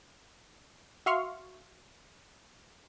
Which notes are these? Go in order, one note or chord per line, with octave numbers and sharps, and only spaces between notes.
F#4 E5 F5 C6 C#6 F6